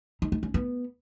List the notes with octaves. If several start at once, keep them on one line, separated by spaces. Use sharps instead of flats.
D#4
D#4
C#4
B3